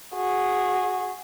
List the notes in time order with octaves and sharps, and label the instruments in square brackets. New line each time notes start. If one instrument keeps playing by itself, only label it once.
[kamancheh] F#4 G#4